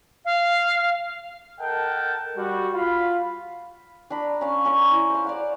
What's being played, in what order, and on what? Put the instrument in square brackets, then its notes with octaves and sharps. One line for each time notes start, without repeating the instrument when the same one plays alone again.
[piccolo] F5
[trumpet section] A4 A#4 D#5 F#5 G5 A5
G3 F#4
F4 F5 B5
[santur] D4 A#5 B5
C#4 F5
C#4 A#4 C#6
E4
C5 F5
D5 F5 F#5